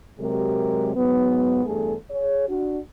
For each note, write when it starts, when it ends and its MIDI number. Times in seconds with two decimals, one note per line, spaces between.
0.20 0.92 48
0.20 0.92 54
0.20 0.92 56
0.20 0.92 67
0.20 0.92 70
0.96 1.65 44
0.96 1.65 54
0.96 1.65 59
1.66 1.94 40
1.66 1.94 43
1.66 1.94 57
1.66 1.94 68
1.66 1.94 69
2.11 2.47 68
2.11 2.47 73
2.49 2.78 62
2.49 2.78 66